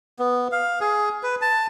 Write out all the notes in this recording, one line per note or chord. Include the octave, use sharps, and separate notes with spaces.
B3
F5
G#4
B4
A5